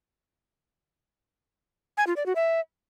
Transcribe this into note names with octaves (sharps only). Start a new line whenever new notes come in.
G#5
F4
D5
F#4
E5